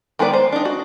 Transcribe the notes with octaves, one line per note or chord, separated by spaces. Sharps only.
D#3 G#3 B3 B4 D5
C5
D4 D#4
F#4